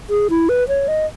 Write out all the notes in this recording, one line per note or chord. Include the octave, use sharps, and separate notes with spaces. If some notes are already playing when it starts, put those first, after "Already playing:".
G#4
E4
B4
C#5
D#5